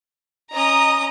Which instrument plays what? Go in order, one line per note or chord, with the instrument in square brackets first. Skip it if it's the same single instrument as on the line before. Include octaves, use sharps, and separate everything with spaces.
[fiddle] C#4 D#6 [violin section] D#5 A#5